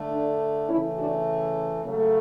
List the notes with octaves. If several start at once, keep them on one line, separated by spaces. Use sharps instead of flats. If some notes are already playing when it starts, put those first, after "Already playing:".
Already playing: D3 A3
D4
C#3 E3 A3 C#4 E4
D4 F#4
C#3 F#3 A3